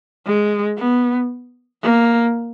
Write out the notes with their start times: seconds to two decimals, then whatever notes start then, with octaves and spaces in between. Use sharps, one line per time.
0.26 G#3
0.78 B3
1.82 A#3